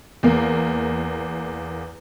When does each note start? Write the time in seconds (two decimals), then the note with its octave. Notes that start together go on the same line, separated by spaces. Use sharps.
0.23 E2 A#3